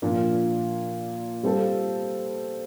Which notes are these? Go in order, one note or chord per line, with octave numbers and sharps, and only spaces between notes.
A#2 F3 A#3 D4
G3 C4 F4 A4